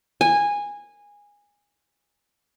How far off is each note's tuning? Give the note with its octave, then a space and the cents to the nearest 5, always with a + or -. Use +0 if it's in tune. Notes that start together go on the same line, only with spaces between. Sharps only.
G#5 -15